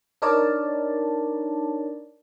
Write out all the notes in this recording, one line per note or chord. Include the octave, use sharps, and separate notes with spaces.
D4 D#4 A#4 C#5 D5 A5